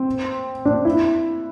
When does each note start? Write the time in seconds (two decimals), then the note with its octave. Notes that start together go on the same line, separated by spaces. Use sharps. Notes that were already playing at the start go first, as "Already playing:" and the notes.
Already playing: C4
0.65 D4
0.85 E4